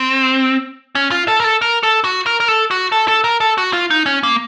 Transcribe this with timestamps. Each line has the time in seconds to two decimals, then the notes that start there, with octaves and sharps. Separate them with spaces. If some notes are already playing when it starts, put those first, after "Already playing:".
Already playing: C4
0.95 C#4
1.11 F4
1.28 A4
1.40 A#4
1.44 A4
1.62 A#4
1.83 A4
2.04 F#4
2.26 A#4
2.40 A#4
2.48 A4
2.71 F#4
2.92 A4
3.08 A4
3.24 A#4
3.41 A4
3.58 F#4
3.73 F4
3.90 D#4
4.06 C#4
4.23 A#3